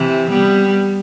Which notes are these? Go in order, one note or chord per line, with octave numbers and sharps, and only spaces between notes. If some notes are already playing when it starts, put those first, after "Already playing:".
Already playing: C3 E3
G3 B3